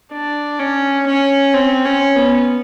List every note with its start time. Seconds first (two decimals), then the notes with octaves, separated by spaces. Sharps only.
0.13 D4
0.59 C#4
1.07 C#4
1.54 C4
1.86 C#4
2.16 B3